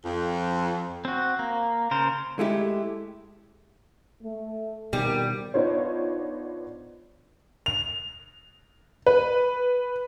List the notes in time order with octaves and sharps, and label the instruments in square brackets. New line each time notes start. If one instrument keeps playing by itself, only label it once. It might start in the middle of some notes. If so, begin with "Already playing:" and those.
[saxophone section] F2
[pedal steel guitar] C4 F#4
A#3
C#3 A#4 C5
[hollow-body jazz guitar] G#3 A3 E4 G4
[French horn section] A3
[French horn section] F2 C4 A#4 [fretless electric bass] B2 D#3 [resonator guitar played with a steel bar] G3
[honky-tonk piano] B3 D4 D#4 F4 C5 C#5
F7
B4